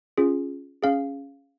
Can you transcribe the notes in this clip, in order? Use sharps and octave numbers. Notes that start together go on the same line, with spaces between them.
C#4 F4 G#4
C#4 G#4 F5